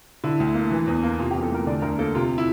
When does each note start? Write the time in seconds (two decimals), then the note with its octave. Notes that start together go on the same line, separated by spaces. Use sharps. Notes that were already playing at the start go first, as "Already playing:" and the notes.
0.24 D3 E4
0.40 D2
0.55 A#3
0.71 E3
0.87 E2
1.03 A#3
1.19 C3 F4
1.31 G4
1.35 E2
1.43 A4
1.51 A3 A#4
1.67 D3 D5
1.82 D2 A#4
1.99 A#3 A4
2.15 C3 F4
2.38 E4